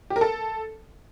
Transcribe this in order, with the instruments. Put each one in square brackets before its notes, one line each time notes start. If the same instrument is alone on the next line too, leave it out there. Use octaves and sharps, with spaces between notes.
[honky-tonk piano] G4
A#4
A4